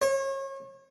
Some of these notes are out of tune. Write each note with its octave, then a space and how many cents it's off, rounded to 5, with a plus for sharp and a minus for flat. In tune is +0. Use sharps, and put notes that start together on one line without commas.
C#5 -35